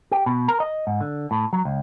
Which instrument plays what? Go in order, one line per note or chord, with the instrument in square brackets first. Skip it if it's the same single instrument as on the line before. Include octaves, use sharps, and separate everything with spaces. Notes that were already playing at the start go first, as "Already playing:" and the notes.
[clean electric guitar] G4
B2
A#4
D#5
G#2
D3
A2
F#3
C#2